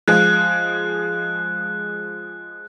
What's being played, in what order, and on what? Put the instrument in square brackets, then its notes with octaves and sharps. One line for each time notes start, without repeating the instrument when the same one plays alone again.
[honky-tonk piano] F3 G#3 [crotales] F#6